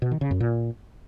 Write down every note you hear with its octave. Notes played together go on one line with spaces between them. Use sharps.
B2
D#3
C#3
F#2
A#2